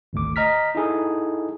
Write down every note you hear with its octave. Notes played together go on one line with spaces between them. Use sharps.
G#1 D2 D6
D#5 A#5 F6 B6
D#4 E4 G#4 A4